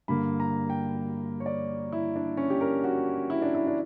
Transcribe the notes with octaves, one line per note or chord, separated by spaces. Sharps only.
G2 D3 A#3 B5
A#5
G5
C#5
D5
E4
D4
C#4
G4
A#4
F#4
E4
D4
E4
D4